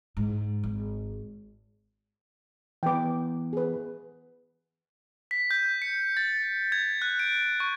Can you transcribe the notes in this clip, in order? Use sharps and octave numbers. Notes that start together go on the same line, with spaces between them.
G#2
G#1
E3 B3 G5 D6
G#4 B4
B6
G6
C#7
A6
G#6
F#6
D7
C#6